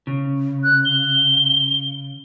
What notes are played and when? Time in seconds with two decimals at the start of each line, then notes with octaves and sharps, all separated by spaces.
0.07 C#3
0.64 F#6
0.85 G7